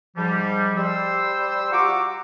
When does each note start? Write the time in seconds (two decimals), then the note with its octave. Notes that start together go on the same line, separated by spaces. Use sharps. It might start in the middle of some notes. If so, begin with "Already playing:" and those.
0.17 G#2 F3 G3
0.78 G3 G4 C5 E6
1.72 F4 F#4 F#5 A#5 C#6 D6